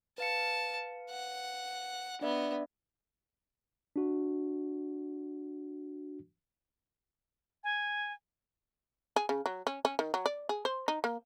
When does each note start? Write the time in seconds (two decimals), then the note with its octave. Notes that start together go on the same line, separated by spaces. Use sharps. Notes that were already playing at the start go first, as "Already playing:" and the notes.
0.18 B4 F5 A5 C#7
1.10 F#5
2.21 B3 D4 D5 E5
3.96 D4 F#4
7.64 G#5
9.16 G#4
9.29 C#3
9.46 F#3
9.67 C#4
9.85 C#4
9.99 D#3
10.14 F#3
10.26 D5
10.49 G#4
10.65 C5
10.88 D#4
11.04 A#3